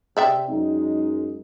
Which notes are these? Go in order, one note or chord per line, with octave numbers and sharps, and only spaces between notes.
C3 D5 E5 G5
F#2 G#3 D#4